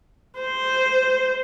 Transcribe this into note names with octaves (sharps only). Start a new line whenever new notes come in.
C5